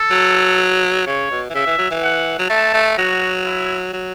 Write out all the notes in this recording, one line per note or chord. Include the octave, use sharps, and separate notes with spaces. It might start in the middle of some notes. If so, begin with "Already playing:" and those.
Already playing: A4
F#3
C#3 C#5
B2
E3
C#3 E5
E3
F#3
E3
F#5
F#3
A3 A5
A3
F#3 F#4
E4
F#3